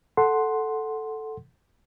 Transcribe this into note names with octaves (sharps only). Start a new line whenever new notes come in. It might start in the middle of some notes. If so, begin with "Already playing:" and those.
A4 F#5 C6